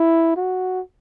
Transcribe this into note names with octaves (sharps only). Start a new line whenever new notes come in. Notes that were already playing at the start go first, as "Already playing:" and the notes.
Already playing: E4
F#4